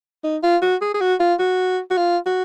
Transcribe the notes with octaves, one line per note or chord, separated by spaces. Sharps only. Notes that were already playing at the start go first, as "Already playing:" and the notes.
D#4
F4
F#4
G#4
G#4
F#4
F4
F#4
F#4
F4
F#4